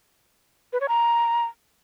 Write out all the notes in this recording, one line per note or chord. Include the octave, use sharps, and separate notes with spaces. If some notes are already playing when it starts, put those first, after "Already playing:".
B4
C#5
A#5